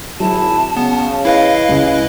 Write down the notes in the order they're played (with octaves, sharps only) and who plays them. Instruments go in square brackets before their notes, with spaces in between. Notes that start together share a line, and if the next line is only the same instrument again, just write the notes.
[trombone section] G#1 E4 G#4 [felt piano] F#3 [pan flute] A5
[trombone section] C#3 [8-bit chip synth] B3
[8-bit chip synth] E4 B4 D#5 [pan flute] F5
[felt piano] C#2 C#3